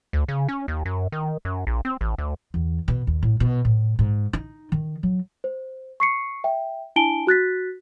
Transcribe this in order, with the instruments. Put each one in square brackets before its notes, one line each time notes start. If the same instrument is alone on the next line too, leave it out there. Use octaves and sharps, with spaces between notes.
[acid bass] D2
C#3
C#4
D#2
F#2
D#3
F#2
A#1
C4
A1
D2
[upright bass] E2
B2
D#2
A2
B2
A2
G#2
D#4
D#3
F#3
[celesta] C5
C#6 C7 C#7
E5 G5
D4 E4 G#5 A5 D7 G7
F#4 F#6 A6 B6